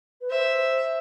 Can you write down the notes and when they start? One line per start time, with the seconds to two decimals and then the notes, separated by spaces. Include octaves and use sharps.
0.21 B4
0.30 C5 E5